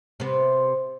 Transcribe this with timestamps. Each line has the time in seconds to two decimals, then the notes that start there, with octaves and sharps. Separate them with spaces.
0.20 C3 B3